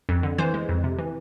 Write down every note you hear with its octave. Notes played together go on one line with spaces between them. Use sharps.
F2
D3
E3 C5
G#3
F2
C3
E3